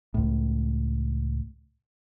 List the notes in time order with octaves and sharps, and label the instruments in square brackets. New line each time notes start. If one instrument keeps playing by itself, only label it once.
[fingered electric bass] C#2 A2